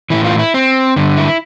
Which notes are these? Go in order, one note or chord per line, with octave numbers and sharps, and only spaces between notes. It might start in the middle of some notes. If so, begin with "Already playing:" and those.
A2 E3 E4
F4
E4
C4
G2 D3
E4